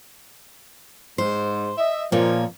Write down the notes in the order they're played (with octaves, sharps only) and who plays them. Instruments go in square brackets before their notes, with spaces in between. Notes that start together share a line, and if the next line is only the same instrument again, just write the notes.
[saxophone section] G#2 [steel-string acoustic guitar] C5
[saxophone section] D#5 E5
[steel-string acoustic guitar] A#2 A#3 C#5 [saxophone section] F3